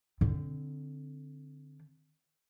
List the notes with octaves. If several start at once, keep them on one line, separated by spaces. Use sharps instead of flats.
D3 C4